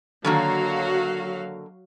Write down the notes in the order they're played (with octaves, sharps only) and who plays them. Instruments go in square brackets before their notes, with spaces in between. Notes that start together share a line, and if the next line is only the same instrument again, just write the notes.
[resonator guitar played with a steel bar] D3 D#3 A#3 [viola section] F#3 F#4 F5